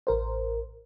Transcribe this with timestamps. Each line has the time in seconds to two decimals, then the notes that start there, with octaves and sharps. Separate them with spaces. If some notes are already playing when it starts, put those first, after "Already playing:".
0.07 A1 A#4 C5